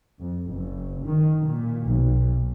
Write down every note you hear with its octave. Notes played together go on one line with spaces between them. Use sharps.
F2
F#1
D#3
A#2
B1